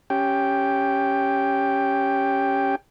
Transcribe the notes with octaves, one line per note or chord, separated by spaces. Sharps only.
C#4 G4 G5